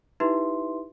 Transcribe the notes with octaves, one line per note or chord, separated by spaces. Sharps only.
D#4 E4 G4 B4 E5 C6